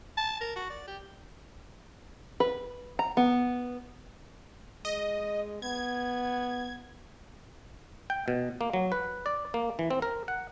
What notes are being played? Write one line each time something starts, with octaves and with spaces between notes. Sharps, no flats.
A5
A#4
F#4
D5
G4
B4
A#5
B3
G#3 D#5
B3 G#6
G5
B2
A#3
F#3
B4
D5
A#3
E3
C4
A#4
F#5